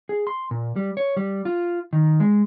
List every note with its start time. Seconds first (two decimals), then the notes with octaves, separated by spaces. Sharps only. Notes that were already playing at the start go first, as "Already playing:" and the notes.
0.09 G#4
0.27 C6
0.51 A#2
0.76 G3
0.97 C#5
1.17 G3
1.45 F4
1.93 D#3
2.20 G#3